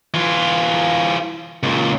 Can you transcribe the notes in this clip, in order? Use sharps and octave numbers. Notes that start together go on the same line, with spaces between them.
E3 F4
C#2 A#2